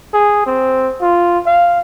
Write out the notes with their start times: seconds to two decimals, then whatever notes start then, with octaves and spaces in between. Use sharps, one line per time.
0.13 G#4
0.46 C4
1.02 F4
1.46 F5